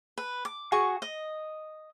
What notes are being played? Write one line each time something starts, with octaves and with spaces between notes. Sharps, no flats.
B4
D6
F#4 G#4 C#6
D#5